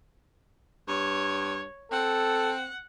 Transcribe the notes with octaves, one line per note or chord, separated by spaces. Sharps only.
G2 C#5
C4 A4 F#5